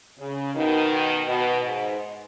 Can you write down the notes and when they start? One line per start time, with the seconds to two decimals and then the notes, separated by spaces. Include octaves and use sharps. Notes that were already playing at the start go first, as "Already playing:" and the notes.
0.18 C#3
0.54 B2 D#3
1.27 B2
1.63 G#2